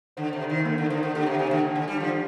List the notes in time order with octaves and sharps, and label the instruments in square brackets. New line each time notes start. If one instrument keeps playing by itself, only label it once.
[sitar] D3 [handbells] C5
[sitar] C3
[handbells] C5
[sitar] D#3
[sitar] D3 [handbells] A#3
[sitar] D3
[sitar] D3 [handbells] C5
[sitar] D3
[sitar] D3 [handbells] G4
[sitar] C3
[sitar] C3 [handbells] G#5
[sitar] D3
[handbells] D4
[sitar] D3
[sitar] G3 [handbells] G4
[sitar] F3
D3